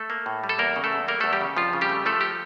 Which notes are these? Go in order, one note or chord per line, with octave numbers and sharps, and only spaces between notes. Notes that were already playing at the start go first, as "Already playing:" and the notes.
Already playing: A3 A4
A#3
A2
G3
A4
E2 A#3 A#4
C#3
A3 A4
E2
G3 A#3 A#4
E2 A3 A4
G3 G4
C#3
F2 F3 F4
C#3
G3 G4
A3
F3 A3 A4
G4